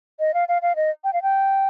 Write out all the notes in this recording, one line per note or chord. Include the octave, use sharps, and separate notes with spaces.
D#5
F5
F5
F5
D#5
G5
F5
G5